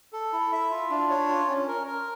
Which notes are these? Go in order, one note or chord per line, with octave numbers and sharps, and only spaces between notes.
A4
E4
E5
F4
D4
C#5
F4
C#4
A#4
A#4